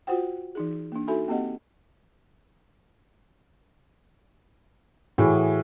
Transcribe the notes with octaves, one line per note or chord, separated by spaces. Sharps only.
F4 F#4 C5 F#5 G5
E3 D#4 G#4
A#3 D4
D#4 F#4 A4 E5 G#5 B5
A#3 C4 G4 D#5 F#5
A2 E3 F#4 G#4